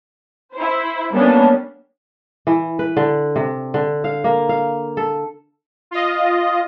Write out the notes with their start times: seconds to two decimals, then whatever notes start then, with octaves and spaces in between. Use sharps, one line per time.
0.54 E4 C5
1.12 G3 A#3 B3 C#4 D4
2.47 E3
2.79 B4
2.97 D3
3.36 C3
3.74 D3
4.04 F5
4.24 A#3
4.49 F5
4.97 A4
5.91 F4 D#5